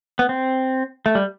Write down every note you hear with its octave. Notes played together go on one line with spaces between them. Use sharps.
B3
C4
A3
G3